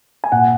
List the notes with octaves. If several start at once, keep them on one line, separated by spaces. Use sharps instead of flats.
G#5
A#2 F#5